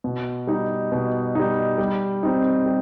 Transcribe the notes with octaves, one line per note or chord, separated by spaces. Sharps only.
B2
G3 D#4
B2
G3 D#4
G3
C4 D#4
G3